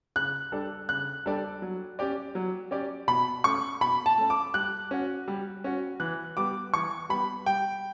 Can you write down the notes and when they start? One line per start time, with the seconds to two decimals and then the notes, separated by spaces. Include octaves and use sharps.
0.16 C#3 F#6
0.52 G3 D4 A4 D5
0.89 C#3 F#6
1.26 G3 D4 A4 D5
1.62 F#3
1.99 C#4 G4 D5
2.35 F#3
2.71 C#4 G4 D5
3.08 B2 B5
3.44 A3 C#4 C#6
3.81 B2 B5
4.06 A5
4.18 A3 C#4
4.30 D6
4.54 G3 F#6
4.91 C#4 F#4
5.28 G3
5.64 C#4 F#4
6.00 E3 F#6
6.37 G3 B3 D6
6.74 E3 C#6
7.09 G3 B3 B5
7.46 G3 G5